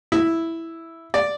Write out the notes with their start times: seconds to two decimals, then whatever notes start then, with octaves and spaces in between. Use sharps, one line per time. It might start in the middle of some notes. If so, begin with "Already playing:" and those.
0.12 E4
1.14 D5